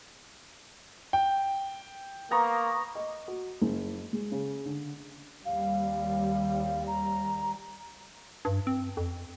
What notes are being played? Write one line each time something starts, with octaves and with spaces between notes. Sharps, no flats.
G5
A#3 B3 A#5 C#6
D#5
F#4
F#1
G#3
C#3
D3
D#2 G3 F5
A#5
G2
C4
F2